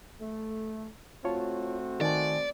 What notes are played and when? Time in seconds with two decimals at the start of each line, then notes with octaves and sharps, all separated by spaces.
0.20 A3
1.25 A3 C4 F4 F#4 C#5 A5
2.01 D#3 D5 G#5 A5